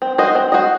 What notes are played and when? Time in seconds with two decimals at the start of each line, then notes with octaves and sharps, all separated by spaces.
0.02 C4
0.18 F#4 C5 D#5
0.35 C4
0.52 F#4 C5 D#5